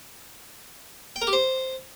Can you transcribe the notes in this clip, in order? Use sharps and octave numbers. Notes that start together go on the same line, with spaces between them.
G5
A#4
G4
C5